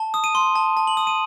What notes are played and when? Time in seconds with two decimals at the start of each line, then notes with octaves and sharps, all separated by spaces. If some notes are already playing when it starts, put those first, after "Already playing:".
Already playing: A5
0.14 D#6
0.24 D#7
0.35 C6
0.55 A5
0.77 A5
0.87 F#7
0.97 D#6
1.07 D#7